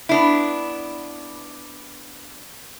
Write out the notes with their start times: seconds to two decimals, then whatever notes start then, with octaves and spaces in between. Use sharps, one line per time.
0.09 B3 D4 E4